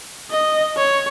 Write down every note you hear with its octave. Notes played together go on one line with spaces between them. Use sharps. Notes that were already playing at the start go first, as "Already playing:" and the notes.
D#5
C#5